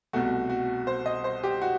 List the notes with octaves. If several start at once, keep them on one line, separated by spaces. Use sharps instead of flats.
C2 B2 A3 F#4
F#4
C5
D#5
C5
G4
F#4